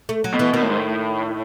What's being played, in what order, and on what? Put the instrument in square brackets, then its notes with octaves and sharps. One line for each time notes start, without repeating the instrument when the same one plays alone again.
[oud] A3
F#3
[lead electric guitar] B2
[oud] E3
[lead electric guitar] B2 [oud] D#3
[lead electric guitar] A2
G#2
A2